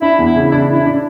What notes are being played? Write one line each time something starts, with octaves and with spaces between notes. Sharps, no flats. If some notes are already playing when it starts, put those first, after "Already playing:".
D4 E4
E2
E4
C#3
E4
D4
D4 E4
D4